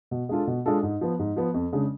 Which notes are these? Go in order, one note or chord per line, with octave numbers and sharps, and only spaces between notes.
B2
G#3 D4 F4 A4
B2
G#3 D4 F4 A4
G#2
F3 B3
G#2
F3 B3
F2
C#3 G#3 D4